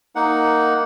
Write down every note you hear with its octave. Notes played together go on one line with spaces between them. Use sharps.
A#3 D#4 F#5